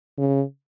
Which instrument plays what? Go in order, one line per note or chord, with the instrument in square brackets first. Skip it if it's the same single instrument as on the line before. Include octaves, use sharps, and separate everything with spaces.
[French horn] C#3